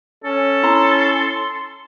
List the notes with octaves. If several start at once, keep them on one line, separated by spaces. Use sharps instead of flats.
C#4 A4
E4 A#5 C6